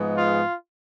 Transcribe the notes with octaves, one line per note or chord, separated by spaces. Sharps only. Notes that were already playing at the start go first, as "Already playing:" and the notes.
Already playing: G#2 F3 G#3 B3
F4